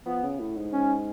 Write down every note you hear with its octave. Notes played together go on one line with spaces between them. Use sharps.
F3 B3
C#3
A2
G#2
C#4